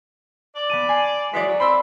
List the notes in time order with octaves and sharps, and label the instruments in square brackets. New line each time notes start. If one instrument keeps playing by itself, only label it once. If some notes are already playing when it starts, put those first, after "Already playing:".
[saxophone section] D5
[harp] B3 A5 D#7
G#5 C7
[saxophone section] E3 F#3 G#3 [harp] D5 B6
[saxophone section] F#3
[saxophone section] C4 [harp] B5 C6 E6